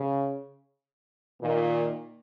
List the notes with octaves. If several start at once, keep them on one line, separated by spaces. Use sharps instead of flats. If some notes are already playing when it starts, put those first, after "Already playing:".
Already playing: C#3
A#2 D#3